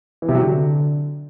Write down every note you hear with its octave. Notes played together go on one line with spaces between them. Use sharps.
E3
C3
F#3
D3